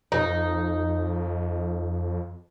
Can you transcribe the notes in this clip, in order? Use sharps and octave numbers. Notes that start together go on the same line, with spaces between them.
F2 D#4